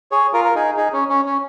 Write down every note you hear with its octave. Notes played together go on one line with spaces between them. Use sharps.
G#4 C#5
F4 A#4
A#4
D#4 G#4
D#4 G#4
C#4
C#4
C#4